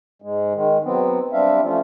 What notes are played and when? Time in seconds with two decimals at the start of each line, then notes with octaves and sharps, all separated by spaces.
0.22 G#2 G#3
0.55 D#3 G#3
0.84 F#3 B3 C4
1.33 G3 C4 D4 E5 F5
1.62 F3 A3 C#4 F4